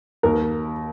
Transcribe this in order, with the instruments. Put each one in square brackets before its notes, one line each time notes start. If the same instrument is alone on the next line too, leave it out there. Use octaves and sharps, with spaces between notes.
[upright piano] D#2 A#4